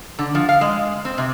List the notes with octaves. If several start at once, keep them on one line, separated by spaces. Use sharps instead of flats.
D3
F3
F5
G#3
C4
C3